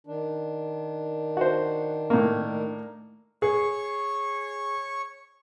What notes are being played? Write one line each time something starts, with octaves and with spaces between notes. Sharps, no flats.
D#3 D4
F#4 C5
A2 A#3
G#4 C#5 C#6